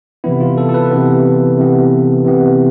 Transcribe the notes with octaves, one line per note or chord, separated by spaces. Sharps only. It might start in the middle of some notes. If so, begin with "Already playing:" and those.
C3 E3 B3 E4
F4
A4
A4
B4
C3 E3 B3
C3 E3 B3
C3 E3 B3